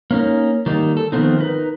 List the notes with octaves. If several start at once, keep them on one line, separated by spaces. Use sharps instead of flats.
A#3 C#4 D#4 A#4
D#3 G3 A#3 D#4
A4
D#3 F3 A3 B3 C4 D#4
D#4 A#4 B4